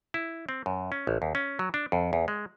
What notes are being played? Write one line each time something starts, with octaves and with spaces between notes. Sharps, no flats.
E4
C4
F#2
C#4
A1
D#2
C#4
F#3
D4
F2
E2
G#3